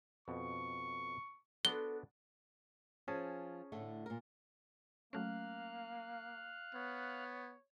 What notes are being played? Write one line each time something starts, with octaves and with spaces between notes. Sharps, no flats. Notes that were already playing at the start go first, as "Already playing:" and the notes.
F2 B2 C#6
B3 D4 F#4 A4 C5 G7
F3 C#4 G#4 A5
A2 D3 A3
A#2 A#4
F#3 A3 A#3 C#4 F5 F6 F#6
B3 C#5